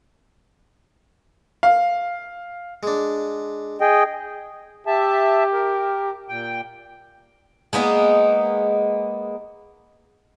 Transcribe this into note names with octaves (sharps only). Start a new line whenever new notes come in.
F5
G#3 D4
G#4 D#5 G5
G4 E5 A5
A#4
A#2 G5
G#3 A#3 B3 D#4